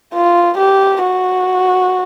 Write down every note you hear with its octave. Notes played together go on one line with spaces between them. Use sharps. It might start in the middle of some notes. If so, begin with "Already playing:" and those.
F4
G4
F#4